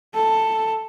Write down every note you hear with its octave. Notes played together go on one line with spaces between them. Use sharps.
A4